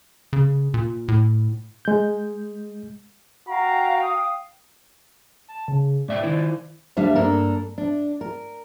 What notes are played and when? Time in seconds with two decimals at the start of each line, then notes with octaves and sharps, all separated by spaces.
0.33 C#3
0.74 A#2
1.08 A2
1.85 G#3 G6
3.48 F#4 F5 G5 A#5
4.02 D#6
5.48 A5
5.68 C#3
6.08 G#2 D5 E5 G5
6.23 D#3 E4 C5
6.97 D2 G3 D4 E5 F5
7.15 G2 A#3 D4 A4 A#4
7.78 D4
8.21 A#4